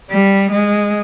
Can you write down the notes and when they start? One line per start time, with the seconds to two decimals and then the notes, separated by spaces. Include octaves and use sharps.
0.11 G3
0.51 G#3